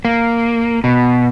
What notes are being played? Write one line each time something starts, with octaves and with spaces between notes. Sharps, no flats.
A#3
B2